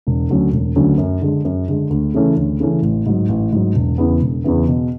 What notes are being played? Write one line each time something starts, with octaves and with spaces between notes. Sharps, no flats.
E1
D2 D3 F#3 C#4
E1
D2 D3 F#3 C#4
F#2
D3 G#3
F#2
D3 G#3
D2
C#3 E3 A3 C#4
D2
C#3 E3 A3 C#4
A1
G#2 F#3
A1
G#2 F#3
E1
E2 C#3 E3 B3
E1
E2 C#3 E3 B3
B2